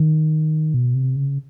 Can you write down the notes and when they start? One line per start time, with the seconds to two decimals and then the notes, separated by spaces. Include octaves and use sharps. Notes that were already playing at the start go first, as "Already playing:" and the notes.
Already playing: D#3
0.74 B2
0.95 C3
1.16 C#3